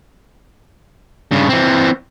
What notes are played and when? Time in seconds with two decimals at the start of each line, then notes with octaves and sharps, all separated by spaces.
1.31 G2 C#3
1.49 E3 C4